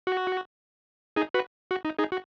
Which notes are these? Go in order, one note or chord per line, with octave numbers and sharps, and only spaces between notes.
F#4
D#4 G#4
F#4 B4
F#4
D#4
D#4 G#4
F#4